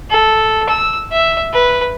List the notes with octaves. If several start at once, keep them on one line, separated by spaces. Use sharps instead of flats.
A4
E6
E5
B4